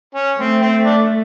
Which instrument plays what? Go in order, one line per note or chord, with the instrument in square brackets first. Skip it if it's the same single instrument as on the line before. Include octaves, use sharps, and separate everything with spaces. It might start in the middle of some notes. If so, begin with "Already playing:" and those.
[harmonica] C#4
[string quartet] A3 [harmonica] C4
[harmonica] C4
D4